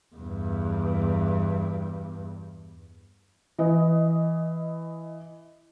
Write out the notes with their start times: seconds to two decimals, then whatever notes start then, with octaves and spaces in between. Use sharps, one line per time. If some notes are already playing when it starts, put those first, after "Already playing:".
0.16 E2 G2
3.59 E3 D#5